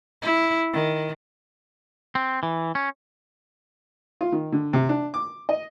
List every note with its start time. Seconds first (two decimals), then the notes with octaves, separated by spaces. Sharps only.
0.22 E4
0.73 D#3
2.15 C4
2.43 E3
2.75 C#4
4.21 F4
4.32 D#3
4.52 D3
4.73 C3
4.89 D4
5.14 D6
5.49 D#5